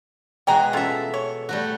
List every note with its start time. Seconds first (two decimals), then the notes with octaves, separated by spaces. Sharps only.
0.47 B2 G#3 F#4 G5 G#5 A#5
0.73 C#4 F4 A4 E5
1.14 C#5
1.49 G3 A3 F#4